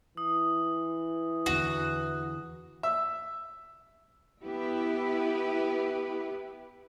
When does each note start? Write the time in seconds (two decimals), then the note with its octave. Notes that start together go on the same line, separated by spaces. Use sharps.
0.17 E3 D#6
1.46 E2 D3 F#4
2.83 E5
4.44 B3 E4 G4 B4